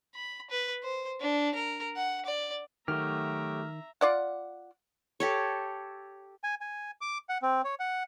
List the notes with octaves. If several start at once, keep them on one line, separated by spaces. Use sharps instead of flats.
B5
B4
C5
D4
A#4
F#5
D5
D#3 F#3 A3 G4 E5 A#5 F6
F4 D5 F#5
G4 A4 C#5
G#5
G#5
D6
F#5
C4
C#5
F#5